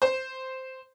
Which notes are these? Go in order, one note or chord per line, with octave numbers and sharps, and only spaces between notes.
C5